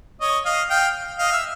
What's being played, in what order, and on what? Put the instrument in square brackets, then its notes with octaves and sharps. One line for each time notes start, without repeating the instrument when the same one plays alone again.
[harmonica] C#5 D#5
D#5 F5
F5 G5
D#5 F5
E5